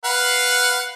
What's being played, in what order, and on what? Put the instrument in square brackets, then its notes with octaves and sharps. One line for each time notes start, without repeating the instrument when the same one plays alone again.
[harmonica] B4 F5 F#5